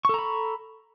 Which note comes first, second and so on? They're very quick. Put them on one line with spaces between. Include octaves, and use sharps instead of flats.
C#6 A4 A#5 B5